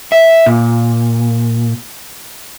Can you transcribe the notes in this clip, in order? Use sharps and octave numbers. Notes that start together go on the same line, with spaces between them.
E5
A#2